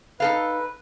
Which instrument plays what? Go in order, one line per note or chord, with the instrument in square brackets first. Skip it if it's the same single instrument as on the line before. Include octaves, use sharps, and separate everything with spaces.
[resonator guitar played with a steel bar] D#4 A4 F5 [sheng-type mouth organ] B4